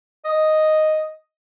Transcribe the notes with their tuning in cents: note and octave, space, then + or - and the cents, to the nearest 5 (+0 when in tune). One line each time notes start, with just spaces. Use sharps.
D#5 +0